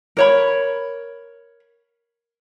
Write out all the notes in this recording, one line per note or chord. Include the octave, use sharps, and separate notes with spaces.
A#4 C#5 B5